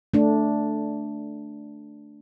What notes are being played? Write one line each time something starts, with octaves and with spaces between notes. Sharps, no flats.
A3 D4